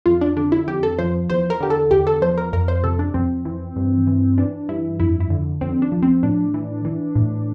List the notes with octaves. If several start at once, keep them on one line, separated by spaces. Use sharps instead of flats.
F2 F4
D4
D3 D4
E4
F2 G4
A4
F3 C5
E2 C5
A#4
D3 G4
A4
E2 G4
A4
F3 C5
A#4
F2 A#4
C5
C3 A4
D4
F2 C4
E3
G2
E3
E3 D4
G2 E4
F2 E4
E4
D3
F2 C4
D4
F3
C4
A2 D4
E3
E3
A2